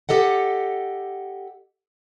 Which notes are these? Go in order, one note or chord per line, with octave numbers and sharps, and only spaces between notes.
G4 A4 D#5 F#5